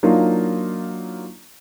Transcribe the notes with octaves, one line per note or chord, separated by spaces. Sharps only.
F#3 A#3 D4 D#4 F4